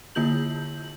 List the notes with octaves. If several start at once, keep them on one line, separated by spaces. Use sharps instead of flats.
D3 A#3 E4 F4 G6 F#7